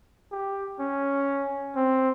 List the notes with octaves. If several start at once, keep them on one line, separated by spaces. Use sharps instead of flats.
G4
C#4
C4